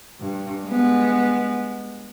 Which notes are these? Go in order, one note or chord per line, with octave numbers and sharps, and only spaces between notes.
G2
G#3 B3